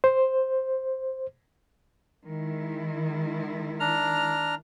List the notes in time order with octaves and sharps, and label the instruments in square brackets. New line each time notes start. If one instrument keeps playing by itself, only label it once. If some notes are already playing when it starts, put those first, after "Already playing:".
[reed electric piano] C5
[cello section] D#3 G#3 E4
[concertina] D4 A#5 F6